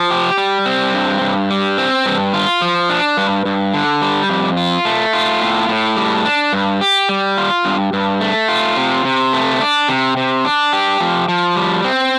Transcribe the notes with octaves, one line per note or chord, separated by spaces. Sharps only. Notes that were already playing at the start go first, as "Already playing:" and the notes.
Already playing: F3
G4
G3
C4
G2
G2
G3
C4
G2
F4
F3
D4
G2
G2
D3
G3
F2
F4
A3
F4
A2
A2
G3
D4
G2
G4
G3
F4
G2
G2
A3
F4
C3
C3
A3
D4
C3
C3
D4
G4
F3
F3
G3
C4